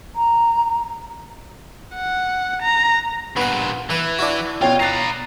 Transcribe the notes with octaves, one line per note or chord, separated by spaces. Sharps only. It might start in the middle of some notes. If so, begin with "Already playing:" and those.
A#5
F#5
A#5
G2 A#2 B3 F#5
E3 B4
D4 E4 F#4
B2 F4 C#5 G5
B3 A#5 F#6 A6 C7